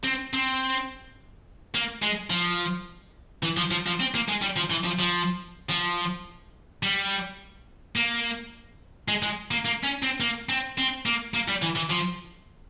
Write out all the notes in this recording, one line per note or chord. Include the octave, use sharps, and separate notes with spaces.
C4
C4
A#3
G#3
F3
E3
F3
F3
F3
C4
A#3
G#3
G3
F3
E3
F3
F3
F3
G3
A#3
G#3
G#3
A#3
A#3
C#4
C4
A#3
C4
C4
A#3
A#3
G3
E3
E3
F3